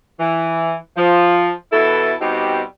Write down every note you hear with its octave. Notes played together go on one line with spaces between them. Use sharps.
E3
F3
B2 E3 E4 A4
B2 G3 C4 D#4 F#4 G4